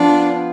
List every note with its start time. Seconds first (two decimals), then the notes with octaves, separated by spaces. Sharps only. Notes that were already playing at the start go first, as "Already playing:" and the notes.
Already playing: F3 B3 D4 F4